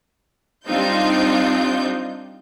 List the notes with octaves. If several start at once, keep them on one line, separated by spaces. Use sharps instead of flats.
G3 C4 D4 D#4 F4 G6